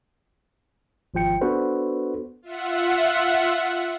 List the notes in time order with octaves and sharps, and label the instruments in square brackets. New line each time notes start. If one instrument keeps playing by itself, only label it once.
[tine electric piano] G#1 F3 F4 G5 C#7
B3 D4 F#4 A4 B4 C5
[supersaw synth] F4 E5 F#5